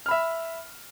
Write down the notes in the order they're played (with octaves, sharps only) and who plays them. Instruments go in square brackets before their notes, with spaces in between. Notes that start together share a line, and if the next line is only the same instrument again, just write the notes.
[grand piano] F6
B5
E5